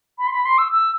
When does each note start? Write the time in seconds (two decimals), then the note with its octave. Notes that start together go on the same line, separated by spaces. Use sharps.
0.18 B5
0.27 C6
0.32 B5
0.45 C6
0.58 E6
0.72 E6